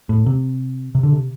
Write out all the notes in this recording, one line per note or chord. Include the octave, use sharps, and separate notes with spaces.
A2
C3
C3
D3
C3